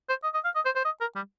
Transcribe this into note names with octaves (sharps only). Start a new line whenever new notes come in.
C5
D#5
D#5
F5
D#5
C5
C5
D#5
A#4
G3